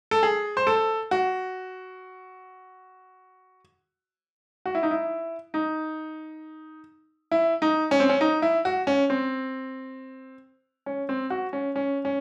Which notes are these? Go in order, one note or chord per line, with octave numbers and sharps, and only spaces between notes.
A4
G#4
C5
A4
F#4
F#4
E4
D#4
E4
D#4
E4
D#4
C#4
C4
C#4
D#4
E4
F#4
C#4
C4
C#4
C4
F#4
C#4
C#4
C#4